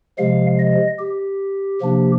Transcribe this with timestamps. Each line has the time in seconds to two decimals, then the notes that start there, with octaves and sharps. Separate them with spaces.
0.18 C3 F3 G#3 F5
0.59 D#5
0.99 G4
1.81 C3 F3 A#3 D4